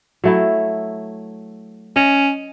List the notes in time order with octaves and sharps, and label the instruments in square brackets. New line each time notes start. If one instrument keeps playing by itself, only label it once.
[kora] F#3 A3 E4
[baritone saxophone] C#4 [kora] D#5